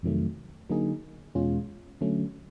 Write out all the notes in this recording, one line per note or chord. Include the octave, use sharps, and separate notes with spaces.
F2 C3 D#3 F#3 A3
D3 F#3 A#3 D#4 G#4
E2 B2 G#3 C#4 F4
D3 F#3 A3 C#4